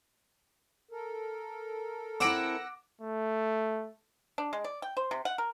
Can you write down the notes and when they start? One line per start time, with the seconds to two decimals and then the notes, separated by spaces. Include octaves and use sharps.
0.91 A4 A#4
2.20 C4 E4 F#5 D6 E6 A#6 D7
3.01 A3
4.38 D4
4.53 G#3
4.64 D5
4.82 G5
4.97 C5
5.11 C3
5.25 F#5
5.38 A#4